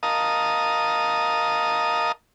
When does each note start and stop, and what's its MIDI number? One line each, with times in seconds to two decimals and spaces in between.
0.03 2.12 70
0.03 2.12 75
0.03 2.12 77
0.03 2.12 81
0.03 2.12 87